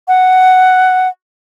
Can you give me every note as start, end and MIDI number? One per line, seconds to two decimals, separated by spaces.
0.08 1.08 78